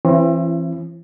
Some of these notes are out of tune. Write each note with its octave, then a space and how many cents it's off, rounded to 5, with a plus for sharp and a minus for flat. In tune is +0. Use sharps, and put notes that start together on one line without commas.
E3 +25 C4 +40 E4 +45